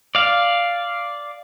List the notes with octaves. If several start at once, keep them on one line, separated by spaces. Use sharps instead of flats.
D5 F5